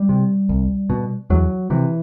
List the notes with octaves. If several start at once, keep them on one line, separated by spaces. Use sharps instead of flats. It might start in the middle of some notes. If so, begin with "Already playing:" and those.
Already playing: G3
C3
C2
B2
E2 F#3
C3 E3